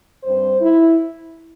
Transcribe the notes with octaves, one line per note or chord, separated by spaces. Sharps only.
G2 G3 C4 C5
E4